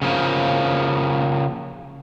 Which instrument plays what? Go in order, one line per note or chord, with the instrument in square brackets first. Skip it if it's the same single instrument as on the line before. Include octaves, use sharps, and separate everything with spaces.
[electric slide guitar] C#3 F3 A#3